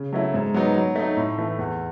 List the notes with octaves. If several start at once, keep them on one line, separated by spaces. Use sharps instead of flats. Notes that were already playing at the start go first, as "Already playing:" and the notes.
Already playing: C#3
F#3 A3 E4
G#2
F#3 B3 D#4
F#3
A3 D#4
A2
E3 A3
E2